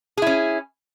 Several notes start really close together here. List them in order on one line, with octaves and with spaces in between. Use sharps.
G#4 E4 C#4